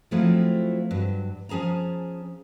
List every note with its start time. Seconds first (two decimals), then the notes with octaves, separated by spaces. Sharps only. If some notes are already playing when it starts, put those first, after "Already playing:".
0.11 F3 F#3 A3 C4 E4 F4
0.91 G2 F#3
1.49 F3 C#4 G#4 A5 A#5